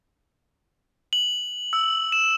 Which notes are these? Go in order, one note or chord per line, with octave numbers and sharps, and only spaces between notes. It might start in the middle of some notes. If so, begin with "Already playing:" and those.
F#7
E6
E7